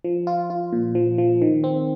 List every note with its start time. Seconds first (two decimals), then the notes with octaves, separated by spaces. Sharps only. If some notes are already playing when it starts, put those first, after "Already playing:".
0.04 F3
0.27 F4
0.50 F4
0.73 A#2
0.95 F3
1.18 F3
1.42 D#3
1.64 C4